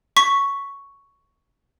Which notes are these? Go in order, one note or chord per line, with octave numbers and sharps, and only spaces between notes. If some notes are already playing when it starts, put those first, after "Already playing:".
C#6 B6